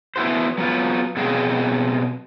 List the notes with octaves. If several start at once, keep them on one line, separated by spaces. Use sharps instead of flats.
B3 E4 F#4 C5
F#3 B3 F4
B2 F#3 C4 G#4 D#5 F5